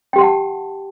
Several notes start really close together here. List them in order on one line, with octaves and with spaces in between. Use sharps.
G5 G4 C6 F#5 A5